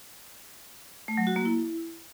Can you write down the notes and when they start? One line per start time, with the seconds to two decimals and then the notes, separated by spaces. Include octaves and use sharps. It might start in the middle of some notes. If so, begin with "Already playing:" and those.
1.08 A3
1.17 F#3
1.27 F#4
1.36 A#3
1.45 E4